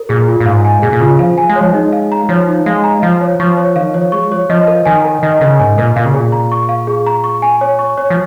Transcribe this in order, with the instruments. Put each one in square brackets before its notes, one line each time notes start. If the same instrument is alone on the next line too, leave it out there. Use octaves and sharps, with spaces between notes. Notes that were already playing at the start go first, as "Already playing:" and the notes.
Already playing: [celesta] A#4
[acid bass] A#2 [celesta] G#4
[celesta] F4
[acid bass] A#2
[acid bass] G#2 [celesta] F5
[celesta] G#5
[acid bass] A#2 [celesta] G#4
[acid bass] A#2
[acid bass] C#3 [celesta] F4
[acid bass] F3 [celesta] F5
[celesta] G#5
[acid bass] G#3
[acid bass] F3 [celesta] C#5
[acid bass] G#3 [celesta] D#4
[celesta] F5
A#5
[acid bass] F3 [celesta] C#5
[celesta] D#4
[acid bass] G#3 [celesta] F5
[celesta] A#5
[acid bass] F3 [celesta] F5
[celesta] C#5
[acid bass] F3 [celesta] C#6
[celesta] C#5
[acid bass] D#3 [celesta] F5
[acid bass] F3 [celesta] C#5
[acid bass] G#3 [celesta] C#6
[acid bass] F3 [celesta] C#5
[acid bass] F3 [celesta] D#5
[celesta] A#4
[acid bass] D#3 [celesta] G#5
[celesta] A#4
[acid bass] D#3 [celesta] D#5
[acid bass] C#3 [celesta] A#4
[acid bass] G#2 [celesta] G#5
[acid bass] A#2 [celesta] A#4
[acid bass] A#2 [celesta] F5
[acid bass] C#3
[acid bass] A#2 [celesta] G#4
[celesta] A#5
C#6
F5
G#4
A#5
C#6
G#5
C#5
C#6
C#5
[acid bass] F3